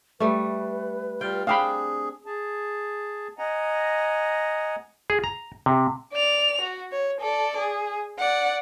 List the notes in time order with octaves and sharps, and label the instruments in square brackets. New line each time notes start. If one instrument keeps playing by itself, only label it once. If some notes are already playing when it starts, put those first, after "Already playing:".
[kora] G3 A3 [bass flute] B4
[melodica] G3 F4 F5 [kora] G5
[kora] C4 D4 [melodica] G#4 [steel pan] F5 G5 B5
[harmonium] G#4 A5
D#5 F#5 G#5 A#5
[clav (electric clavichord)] G#4
A#5
C3
[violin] D5 F7
F#4
C#5
A4 D5
G#4
D5 F#5